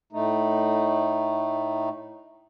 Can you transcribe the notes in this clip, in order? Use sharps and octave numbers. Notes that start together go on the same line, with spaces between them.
A2 A3 D#4